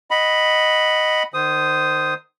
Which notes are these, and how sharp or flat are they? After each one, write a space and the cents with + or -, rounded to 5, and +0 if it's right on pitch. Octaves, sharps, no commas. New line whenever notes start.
D#5 +0 F#5 +0 B5 +0
D#3 -35 C5 -10 D#6 +0